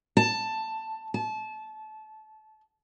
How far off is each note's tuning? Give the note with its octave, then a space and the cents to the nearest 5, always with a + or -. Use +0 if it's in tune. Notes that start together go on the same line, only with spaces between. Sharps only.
A5 +10
A5 -25